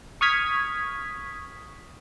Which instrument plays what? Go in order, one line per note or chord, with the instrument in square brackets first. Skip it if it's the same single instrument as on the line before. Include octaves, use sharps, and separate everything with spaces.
[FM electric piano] C#6 D#6 F6 G#6 B6